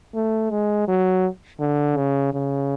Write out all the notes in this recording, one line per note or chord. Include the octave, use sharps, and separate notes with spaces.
A3
G#3
F#3
D3
C#3
C#3